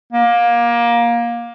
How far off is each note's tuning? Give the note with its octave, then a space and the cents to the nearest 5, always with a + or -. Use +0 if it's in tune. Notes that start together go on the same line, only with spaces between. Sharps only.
A#3 +20